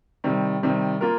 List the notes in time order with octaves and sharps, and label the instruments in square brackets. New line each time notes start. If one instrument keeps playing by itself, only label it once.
[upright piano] C3 D#3 G3
C3 D#3 G3
A#3 F4 A#4